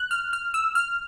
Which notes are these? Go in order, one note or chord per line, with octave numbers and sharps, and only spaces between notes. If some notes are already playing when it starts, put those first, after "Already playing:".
Already playing: F#6
F6
F6
E6
F6